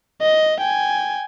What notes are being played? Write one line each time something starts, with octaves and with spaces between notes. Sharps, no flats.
D#5
G5 G#5